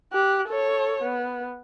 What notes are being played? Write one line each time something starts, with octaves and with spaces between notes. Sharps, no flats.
G4 F#6
A4 C#5
B3